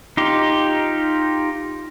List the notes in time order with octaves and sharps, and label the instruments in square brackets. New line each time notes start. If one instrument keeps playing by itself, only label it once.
[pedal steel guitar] D#4 F4 G4